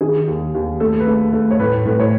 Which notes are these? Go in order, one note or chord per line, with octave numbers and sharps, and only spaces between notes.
D#3 G#4
D#2
D#2
A3 A4
B4
A3
A3
C#5
A2 B4
A2 B4
C#5